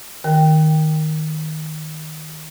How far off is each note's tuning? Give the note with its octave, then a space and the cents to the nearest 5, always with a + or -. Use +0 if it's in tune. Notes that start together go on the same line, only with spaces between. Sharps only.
D#3 +0 A#4 +0 G5 +0